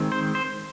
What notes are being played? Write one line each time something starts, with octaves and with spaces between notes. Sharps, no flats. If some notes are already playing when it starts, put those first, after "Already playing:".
Already playing: D#3 G#3 C4
C5
C5